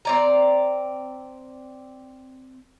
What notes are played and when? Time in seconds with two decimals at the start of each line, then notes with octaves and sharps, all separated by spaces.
0.05 C4 D5 A#5